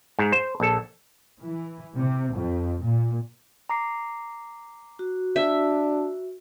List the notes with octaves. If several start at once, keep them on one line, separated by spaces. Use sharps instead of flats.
G#2
C5
A#1 A4
E3
C3
F2
A#2
A#5 D6 C7
F#4
D4 E5